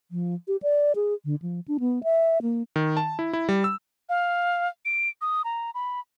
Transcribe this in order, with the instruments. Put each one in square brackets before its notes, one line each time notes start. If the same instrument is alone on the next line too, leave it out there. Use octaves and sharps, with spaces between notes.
[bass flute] F3
G4
D5
G#4
D3
F3
D4
B3
E5
A#3
[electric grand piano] D#3
A5
E4
E4
G3
E6
[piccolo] F5
D7
D#6
A#5
B5